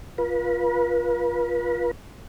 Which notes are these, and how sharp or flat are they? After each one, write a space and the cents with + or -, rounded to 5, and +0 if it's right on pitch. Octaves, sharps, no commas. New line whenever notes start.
F4 +0 B4 -40